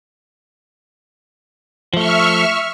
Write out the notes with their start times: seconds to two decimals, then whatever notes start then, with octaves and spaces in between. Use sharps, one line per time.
1.94 F3 A3 E5 C#6 F6